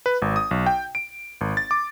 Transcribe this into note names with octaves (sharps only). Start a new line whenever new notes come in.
B4
G#1
D#6
B1
G5
D7
G#1
A6
D6